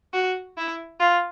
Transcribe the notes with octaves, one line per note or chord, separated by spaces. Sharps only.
F#4
E4
F4